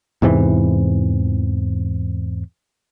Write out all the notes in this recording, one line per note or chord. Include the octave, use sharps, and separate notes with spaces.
E2 G#2 C3 E3